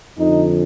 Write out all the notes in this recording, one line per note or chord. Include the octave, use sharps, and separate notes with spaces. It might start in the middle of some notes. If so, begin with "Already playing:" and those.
F2 D3 D#4